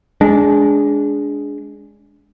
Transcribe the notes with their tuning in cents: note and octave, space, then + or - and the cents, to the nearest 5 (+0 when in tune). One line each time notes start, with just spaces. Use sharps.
G#3 +0 D4 -25